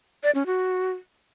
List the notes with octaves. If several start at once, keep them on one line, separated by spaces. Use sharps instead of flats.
D5
C#4
F#4